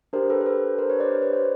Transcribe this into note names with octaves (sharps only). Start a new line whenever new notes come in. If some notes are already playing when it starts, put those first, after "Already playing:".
D4 G4 A#4 C5
A4 B4
C5
A4 B4
A#4 C5
B4 C#5
C5 D5
B4 C#5
C5 D5